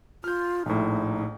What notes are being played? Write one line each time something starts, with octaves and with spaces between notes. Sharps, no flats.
F4 F6 G6
A#1 A2 D#4